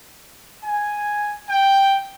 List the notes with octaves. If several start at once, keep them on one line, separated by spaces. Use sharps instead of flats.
G#5
G5